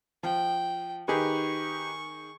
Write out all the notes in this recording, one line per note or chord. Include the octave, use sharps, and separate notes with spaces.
F3 G5
D#3 D#4 G4 G#4 B4 C#6